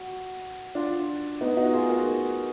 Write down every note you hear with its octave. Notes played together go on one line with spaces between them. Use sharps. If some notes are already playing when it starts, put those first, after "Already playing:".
Already playing: F#4
D4 F4
B3 D#4
D#4 F#4
F4 G#4
F#4 A#4